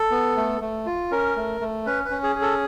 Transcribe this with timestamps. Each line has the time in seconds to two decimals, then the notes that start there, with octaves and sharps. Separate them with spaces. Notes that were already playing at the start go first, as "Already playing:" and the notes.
Already playing: A4
0.11 B3
0.37 A3
0.61 A3
0.86 F4
1.11 C#4 A#4
1.36 A3
1.61 A3
1.86 C#4 B4
2.05 B4
2.11 C#4
2.23 G#4
2.36 G#4
2.42 A4